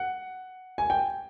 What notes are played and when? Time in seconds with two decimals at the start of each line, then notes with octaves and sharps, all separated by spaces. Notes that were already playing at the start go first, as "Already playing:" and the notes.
Already playing: F#5
0.78 G#5
0.90 G5